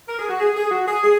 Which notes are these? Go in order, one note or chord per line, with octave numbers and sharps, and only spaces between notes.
A#4
G#4
F#4
G#4
G#4
F#4
G#4
G#4